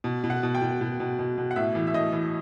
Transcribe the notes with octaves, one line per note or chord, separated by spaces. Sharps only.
B2
B2
F#5
B2
G5
B2
B2
B2
B2
B2
F#5
A2 E5
E3
E5
A2 D#5
E3